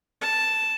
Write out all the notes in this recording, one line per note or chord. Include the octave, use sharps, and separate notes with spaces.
A5